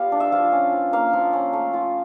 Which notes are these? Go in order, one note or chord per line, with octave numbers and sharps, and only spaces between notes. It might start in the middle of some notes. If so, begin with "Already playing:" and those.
Already playing: G3 B3 F4 F5
D4
E5
F3 F5
C#4
F3
A#3 F5
F3
C#4
A3
F4